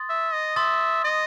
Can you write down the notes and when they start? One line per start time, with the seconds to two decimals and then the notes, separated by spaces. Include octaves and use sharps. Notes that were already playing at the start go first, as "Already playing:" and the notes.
Already playing: C6 D#6 A6
0.09 E5
0.33 D#5
0.56 E5 C6 D#6 A6
1.04 D#5